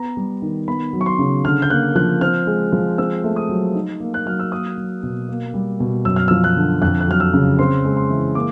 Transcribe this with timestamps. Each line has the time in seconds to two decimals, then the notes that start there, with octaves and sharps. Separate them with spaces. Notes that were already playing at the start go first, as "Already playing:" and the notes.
Already playing: B3 A#5
0.17 G3
0.42 D#3
0.68 B3 B5
0.93 F#3
1.01 C#6
1.06 C6
1.19 C#3
1.45 D3 F6
1.62 G6
1.70 A#3 F#6
1.95 F3 F#6
2.21 C4 F6
2.47 G#3
2.72 F3
2.98 C4 E6
3.24 A3
3.36 D#6
3.49 F#3
3.75 D#4
4.00 A#3
4.14 F#6
4.26 F#3 F6
4.39 E6
4.52 A#3 D#6
4.77 F#3
5.03 B2
5.29 A#3
5.54 G3
5.80 B2
6.05 F#2 E6
6.16 F6
6.28 E6
6.31 F3
6.44 F#6
6.56 D3
6.82 F2 F#6
7.00 F#6
7.08 F#3 F6
7.20 E6
7.33 C#3
7.59 C4 C6
7.85 G#3
7.97 C6
8.10 E3
8.35 A#3 D6